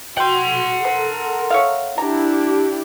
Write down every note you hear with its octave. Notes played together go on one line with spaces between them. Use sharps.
F#4 F#5 G5 C6
A4 A#4 C5
C#5 E5 F5
D4 E4 G4 A#5